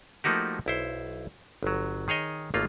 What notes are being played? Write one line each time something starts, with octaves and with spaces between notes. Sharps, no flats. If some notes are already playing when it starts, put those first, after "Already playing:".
F3 A3 A#3 D#4 F#4 G4
B1 E4 C5
G1 F#3
D#3 G#4 C#5 D#5
G#1 A3 A#3 F4